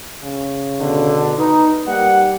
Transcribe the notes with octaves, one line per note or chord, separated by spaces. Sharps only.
C#3
B2 D3
D#4 B4
G3 A#3 F#5